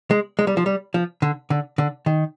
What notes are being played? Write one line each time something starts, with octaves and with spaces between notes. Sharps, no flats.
G#3
G#3
G3
F3
G3
F3
D3
D3
D3
D#3